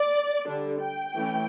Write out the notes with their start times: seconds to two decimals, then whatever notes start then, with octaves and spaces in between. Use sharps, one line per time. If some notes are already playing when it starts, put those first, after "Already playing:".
Already playing: D5
0.47 D3 G3 D4
0.81 G5
1.14 E3 A3 C#4